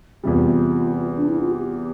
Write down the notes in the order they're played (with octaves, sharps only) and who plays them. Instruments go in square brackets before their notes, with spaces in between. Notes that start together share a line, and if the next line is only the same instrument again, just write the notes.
[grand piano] E2 C3 G3 [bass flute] F4
[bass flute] D4
E4
F4
G4